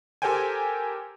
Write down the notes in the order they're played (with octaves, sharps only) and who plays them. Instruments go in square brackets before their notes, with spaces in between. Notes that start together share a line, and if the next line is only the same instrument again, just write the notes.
[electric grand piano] G4 A4 A#4 C5 G5 G#5